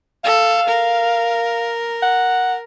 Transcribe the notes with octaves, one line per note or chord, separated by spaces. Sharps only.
A4 F5
A#4
F#5